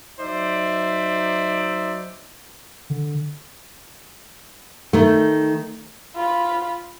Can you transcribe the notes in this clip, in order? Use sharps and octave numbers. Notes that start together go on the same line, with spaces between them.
F#3 D#4 C5 D5 E5
D3
D#3 A3
F4 B5